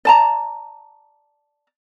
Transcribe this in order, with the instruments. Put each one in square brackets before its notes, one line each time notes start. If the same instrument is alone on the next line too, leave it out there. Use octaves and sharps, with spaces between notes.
[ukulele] D5 A5 A#5